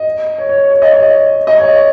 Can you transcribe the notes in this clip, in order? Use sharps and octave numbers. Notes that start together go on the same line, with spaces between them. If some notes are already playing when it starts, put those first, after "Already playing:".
Already playing: D#5
C#5
C#5
C#5
D#5
C#5
D#5
C#5